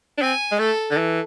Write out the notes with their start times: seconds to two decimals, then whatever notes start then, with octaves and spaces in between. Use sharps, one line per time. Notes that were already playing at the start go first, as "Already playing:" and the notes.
0.18 D4
0.22 C4 G#5
0.51 G#3
0.59 A3 A4
0.91 D3
0.97 E3